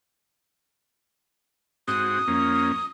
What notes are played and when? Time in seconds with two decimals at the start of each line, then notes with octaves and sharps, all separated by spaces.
1.88 G#2 C4 F#4 D#6
2.28 F2 A#3 C#4